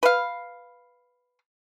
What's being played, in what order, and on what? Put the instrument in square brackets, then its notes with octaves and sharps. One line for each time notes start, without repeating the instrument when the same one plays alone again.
[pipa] B4 F5